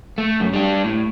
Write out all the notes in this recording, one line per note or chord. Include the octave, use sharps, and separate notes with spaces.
A3
F#2
G3 D4
A2